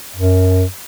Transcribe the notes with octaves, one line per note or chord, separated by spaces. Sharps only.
F#2